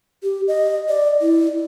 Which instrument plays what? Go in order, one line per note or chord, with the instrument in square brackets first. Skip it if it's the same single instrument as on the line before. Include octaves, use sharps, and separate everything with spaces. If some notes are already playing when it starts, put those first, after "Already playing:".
[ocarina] G4
D#5
D5
E4